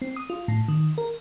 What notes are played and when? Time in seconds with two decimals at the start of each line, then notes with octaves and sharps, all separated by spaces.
0.02 C4
0.16 D#6
0.30 F4
0.48 A2
0.68 D#3
0.98 A#4